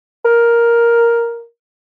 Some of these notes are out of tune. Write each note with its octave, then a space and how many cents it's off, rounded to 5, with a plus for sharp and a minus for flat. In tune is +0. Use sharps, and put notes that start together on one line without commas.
A#4 +5